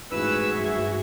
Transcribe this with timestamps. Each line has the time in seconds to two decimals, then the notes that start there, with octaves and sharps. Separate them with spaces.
0.11 A1 G#2 F#4 G#4 B4 E6
0.56 G2 E5